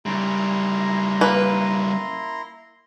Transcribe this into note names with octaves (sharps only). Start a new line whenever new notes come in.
C#3 G3 E4 A#5 C6
A#3 B4